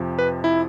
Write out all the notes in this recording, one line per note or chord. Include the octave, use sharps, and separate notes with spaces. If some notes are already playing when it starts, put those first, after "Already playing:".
Already playing: F2 C3 F3
B4
E4